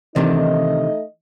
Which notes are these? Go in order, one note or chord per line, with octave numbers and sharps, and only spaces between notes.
C3 D#3 E3 A3 D4 D#4 D#5